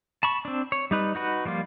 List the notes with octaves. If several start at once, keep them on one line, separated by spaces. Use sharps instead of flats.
A5 B5 C#6
C4 D4
C#5
G3 D#4 B4
D#4 F#4 B4
F3 G3 A#3 F4